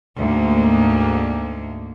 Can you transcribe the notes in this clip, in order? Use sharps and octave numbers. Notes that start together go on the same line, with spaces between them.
D2 G#2 A#3